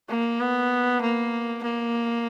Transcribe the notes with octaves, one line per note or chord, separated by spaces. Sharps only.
A#3
B3
A#3
A#3